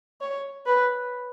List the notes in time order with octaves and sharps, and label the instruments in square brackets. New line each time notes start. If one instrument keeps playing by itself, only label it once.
[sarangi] C#5
B4